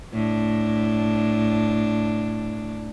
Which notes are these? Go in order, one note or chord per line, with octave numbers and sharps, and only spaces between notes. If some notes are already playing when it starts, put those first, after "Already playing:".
A2 D4